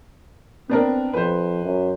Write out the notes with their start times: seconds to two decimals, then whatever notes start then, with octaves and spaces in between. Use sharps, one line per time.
0.70 B3 C4 D4 A#4
1.14 F2 B4 C5
1.64 F#2